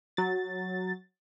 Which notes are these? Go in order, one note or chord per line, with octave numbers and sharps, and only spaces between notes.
F#3 A6